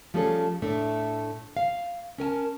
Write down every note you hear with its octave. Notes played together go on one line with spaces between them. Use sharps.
F3 G3 A3 C#4 G#4 A4
A2 A3 D4
F5
C#4 A#4 G#5 A5